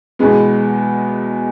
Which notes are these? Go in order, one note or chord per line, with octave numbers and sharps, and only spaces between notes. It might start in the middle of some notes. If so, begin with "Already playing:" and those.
E2 B2 G#3 B3